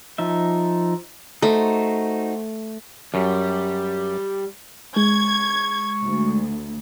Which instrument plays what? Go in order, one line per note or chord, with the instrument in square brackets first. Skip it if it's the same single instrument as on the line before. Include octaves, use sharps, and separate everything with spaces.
[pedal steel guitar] F3 D#4 E5
[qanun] A3 [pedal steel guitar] D#4 F#4 C5
[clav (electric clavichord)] F#2 [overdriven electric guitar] G3
[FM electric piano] G#3 [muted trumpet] C#6 [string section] G#6
[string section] D2